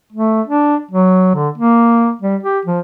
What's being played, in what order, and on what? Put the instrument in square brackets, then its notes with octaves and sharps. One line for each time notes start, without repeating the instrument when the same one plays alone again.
[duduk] A3
D4
F#3
D3
A#3
G3
G4
F3